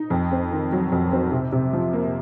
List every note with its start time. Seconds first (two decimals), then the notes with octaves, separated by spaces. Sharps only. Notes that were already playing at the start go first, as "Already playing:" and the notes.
Already playing: D#4
0.10 F2
0.32 C4
0.51 D#3
0.72 F#3
0.92 F2
1.12 C4
1.32 C3
1.52 C3
1.73 F3
1.93 A#3